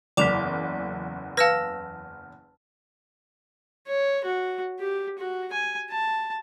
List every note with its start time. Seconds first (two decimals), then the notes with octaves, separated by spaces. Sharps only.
0.17 F#1 E2 D5 D6 B6 E7 F7
1.37 B4 F5 A5 E6 F6 A#6
3.87 C#5
4.25 F#4
4.80 G4
5.18 F#4
5.52 G#5
5.90 A5